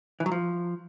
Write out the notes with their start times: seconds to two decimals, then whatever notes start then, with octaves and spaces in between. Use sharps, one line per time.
0.20 E3
0.26 F#3
0.32 F3